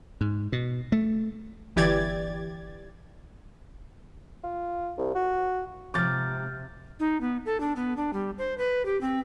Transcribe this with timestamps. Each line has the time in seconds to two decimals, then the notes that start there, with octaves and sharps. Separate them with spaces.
0.21 G#2
0.52 B2
0.92 A3
1.76 G1 E3 G4 D5 G#6 A6
4.44 F4
4.98 C2
5.15 F#4
5.94 G#2 C3 F3 A#5 D6 F6 G6 A6
7.00 D#4
7.21 B3
7.46 A4
7.60 D4
7.76 B3
7.97 D4
8.13 G3
8.38 C5
8.58 B4
8.85 G4
9.01 C4